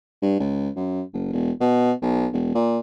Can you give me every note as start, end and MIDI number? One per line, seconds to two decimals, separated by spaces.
0.22 0.36 43
0.40 0.69 37
0.76 1.02 42
1.14 1.30 30
1.32 1.51 28
1.61 1.92 47
2.02 2.27 35
2.33 2.53 28
2.55 2.79 46